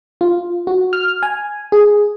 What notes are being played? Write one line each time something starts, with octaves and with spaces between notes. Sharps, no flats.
F4
F#4
F6
G#5
G#4